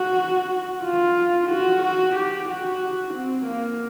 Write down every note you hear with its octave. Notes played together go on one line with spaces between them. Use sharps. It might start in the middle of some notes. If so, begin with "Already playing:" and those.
Already playing: F#4
F4
F#4
F#4
G4
F#4
C4
A#3